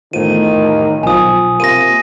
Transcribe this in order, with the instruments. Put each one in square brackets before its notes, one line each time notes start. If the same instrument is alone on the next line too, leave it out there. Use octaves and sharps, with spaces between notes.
[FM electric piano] E2 A2 F3 [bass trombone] D#3 [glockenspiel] D#7
[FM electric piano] B1 F3 [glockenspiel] G#5 D#6
[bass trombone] C3 [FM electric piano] A#3 F4 [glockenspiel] A#6 D#7